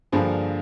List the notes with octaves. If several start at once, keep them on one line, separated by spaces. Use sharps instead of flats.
G2 D3 F3 A#3 D4 G#4 C5